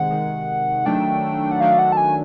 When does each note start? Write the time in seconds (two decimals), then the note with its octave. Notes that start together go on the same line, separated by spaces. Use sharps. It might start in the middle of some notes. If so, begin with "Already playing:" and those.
Already playing: C3 D#3 G#3 F#5
0.11 C3 D#3 G#3
0.86 D#3 F#3 A3 D4 G5
1.51 F#5
1.60 D#3 F#3 A3 D4 F5
1.79 F#5
1.92 A5
1.97 G#5